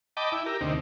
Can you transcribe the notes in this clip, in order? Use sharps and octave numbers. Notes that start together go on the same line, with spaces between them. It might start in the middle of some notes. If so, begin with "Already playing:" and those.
D#5 G5 A5 B5 D6
E4
G4 A#4
D2 C3 D#3